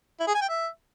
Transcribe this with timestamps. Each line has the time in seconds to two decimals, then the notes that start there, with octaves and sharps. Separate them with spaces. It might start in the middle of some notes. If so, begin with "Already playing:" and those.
0.20 E4
0.27 G#4
0.34 G#5
0.42 G5
0.49 E5